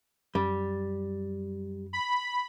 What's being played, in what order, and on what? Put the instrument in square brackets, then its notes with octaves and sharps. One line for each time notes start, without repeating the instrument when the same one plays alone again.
[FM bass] F#2 [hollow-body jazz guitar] G3
[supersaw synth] B5